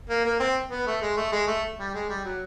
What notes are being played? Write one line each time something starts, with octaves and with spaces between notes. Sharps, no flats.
A#3
A#3
C4
B3
A3
G#3
A3
G#3
A3
G3
G#3
G3
F#3